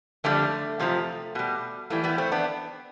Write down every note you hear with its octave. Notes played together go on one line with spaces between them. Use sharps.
F2 D3 G3 A3
F2 C3 F3
B2 G3
A2 E3 G3 A3
G3 B3
A3 C4
B3 D4